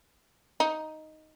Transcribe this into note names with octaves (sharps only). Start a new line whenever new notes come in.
D#4